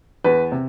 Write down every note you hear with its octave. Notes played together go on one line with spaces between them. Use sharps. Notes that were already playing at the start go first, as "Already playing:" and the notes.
E2 B4
C3